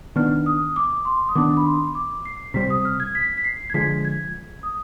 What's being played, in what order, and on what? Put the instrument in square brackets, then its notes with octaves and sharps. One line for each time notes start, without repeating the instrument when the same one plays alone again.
[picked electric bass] D#3 B3 D4 [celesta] F6
[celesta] D#6
D6
C6
D#6
[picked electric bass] D#3 B3 D4 [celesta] D6
[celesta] B5
C6
D6
C7
[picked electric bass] C3 G3 C4 [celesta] B6
[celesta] D#6
F6
G#6
B6
B6
C7
G#6
[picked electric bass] D3 F3 G#3 [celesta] B6
[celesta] G#6
D#6